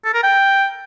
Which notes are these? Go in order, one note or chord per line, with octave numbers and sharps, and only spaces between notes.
A4
A#4
G5